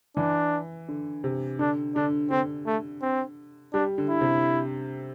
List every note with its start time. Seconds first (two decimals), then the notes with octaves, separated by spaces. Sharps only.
0.17 E3 D4
0.89 D3
1.24 C3
1.59 D3 D4
1.96 D3 D4
2.30 D3 C4
2.66 A3
3.02 C4
3.74 G3 D4
3.98 D3
4.09 E4
4.21 C3